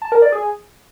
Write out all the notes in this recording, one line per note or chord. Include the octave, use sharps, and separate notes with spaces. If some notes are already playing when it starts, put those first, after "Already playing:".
A5
A#4
D5
G#4